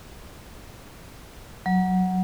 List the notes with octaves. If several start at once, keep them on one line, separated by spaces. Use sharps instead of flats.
F#3